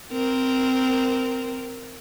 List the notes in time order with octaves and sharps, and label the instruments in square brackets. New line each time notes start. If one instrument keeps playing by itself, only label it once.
[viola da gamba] C4 A#4